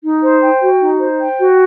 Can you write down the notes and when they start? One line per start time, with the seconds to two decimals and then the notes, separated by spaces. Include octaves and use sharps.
0.03 D#4
0.23 C5
0.42 G5
0.61 F#4
0.81 D#4
1.00 C5
1.19 G5
1.39 F#4